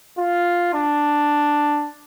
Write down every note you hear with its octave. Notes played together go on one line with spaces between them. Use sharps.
F4
D4